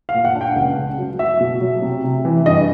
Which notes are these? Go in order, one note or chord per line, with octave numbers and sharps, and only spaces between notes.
F5
A#2
F#5
D4
G5
C#2 F#5
C#3
F#3
F#3 E5
B2
F#3
C3
C3
E3
G2 D#5